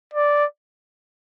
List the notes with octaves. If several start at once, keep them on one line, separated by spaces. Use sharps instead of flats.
D5